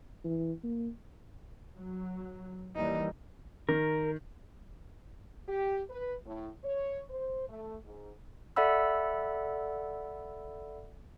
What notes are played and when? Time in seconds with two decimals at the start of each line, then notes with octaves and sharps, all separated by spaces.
0.25 E3
0.64 A#3
1.76 F#3
2.76 D#2 E3 G3 D#4
3.69 D#3 A#4
5.49 G4
5.90 B4
6.26 A2
6.64 C#5
7.10 C5
7.49 A3
7.86 G#2
8.56 A4 D5 E5 F#5 B5 E6